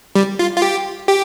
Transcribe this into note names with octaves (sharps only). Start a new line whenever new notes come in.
G3
F4
F4
G4
G4